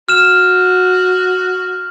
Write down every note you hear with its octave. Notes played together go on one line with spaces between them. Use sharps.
F#4 F6 E7